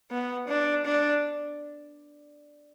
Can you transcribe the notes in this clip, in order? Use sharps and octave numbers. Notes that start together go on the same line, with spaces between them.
B3
D4
D4